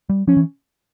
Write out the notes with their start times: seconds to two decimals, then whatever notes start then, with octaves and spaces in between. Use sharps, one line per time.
0.09 G3
0.27 F3 C#4
0.37 E3